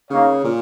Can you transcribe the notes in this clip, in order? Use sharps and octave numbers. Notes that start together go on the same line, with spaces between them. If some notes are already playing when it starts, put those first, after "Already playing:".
C#3 A#3 D#4 C#5 F5
A#2